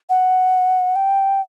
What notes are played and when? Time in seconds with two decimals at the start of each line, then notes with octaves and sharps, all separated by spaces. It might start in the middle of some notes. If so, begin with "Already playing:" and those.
0.10 F#5
0.96 G5